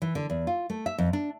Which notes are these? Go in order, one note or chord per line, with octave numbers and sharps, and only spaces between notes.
E3
D3
E2
F4
A3
E5
F2
D4